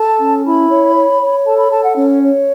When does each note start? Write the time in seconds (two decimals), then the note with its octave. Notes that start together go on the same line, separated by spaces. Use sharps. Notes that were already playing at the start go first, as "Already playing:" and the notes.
Already playing: A4 A5
0.19 C#4
0.44 E4 B5
0.70 C#5
0.95 C#5
1.20 C#5
1.45 A4 A5
1.58 B5
1.71 A4 A5
1.84 F#5
1.97 C#4 C#5
2.22 C#5